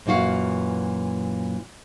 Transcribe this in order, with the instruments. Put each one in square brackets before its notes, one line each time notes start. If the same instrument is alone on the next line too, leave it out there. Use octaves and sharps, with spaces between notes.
[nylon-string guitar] F#2 A#2 E3 F#4 F5